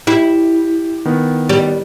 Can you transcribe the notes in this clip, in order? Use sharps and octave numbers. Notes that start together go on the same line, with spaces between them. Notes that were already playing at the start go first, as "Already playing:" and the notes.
E4 G4
D#3 B3
G3